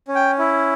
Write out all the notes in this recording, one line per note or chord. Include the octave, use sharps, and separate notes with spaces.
C#4
G5
E4